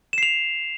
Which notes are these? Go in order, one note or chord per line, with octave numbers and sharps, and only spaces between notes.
C7 E7 F7